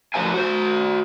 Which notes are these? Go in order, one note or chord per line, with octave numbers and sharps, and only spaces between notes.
A2 F3 A3 B4 F5 G#5
F#4 C5